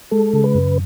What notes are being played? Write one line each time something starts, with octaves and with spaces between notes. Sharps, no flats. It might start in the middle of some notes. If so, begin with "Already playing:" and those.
G#3 A4
C#3
B4
F#2